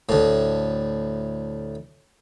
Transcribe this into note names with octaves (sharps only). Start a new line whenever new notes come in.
D2 A2